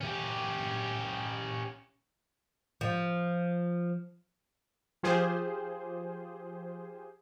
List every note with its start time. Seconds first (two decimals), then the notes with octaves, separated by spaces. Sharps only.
0.01 C#4 G4
2.81 F3
5.03 F3 F4 G4 G#4 C5